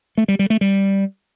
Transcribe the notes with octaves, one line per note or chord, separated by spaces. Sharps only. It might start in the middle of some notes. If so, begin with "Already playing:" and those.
A3
G3
G3
A3
G3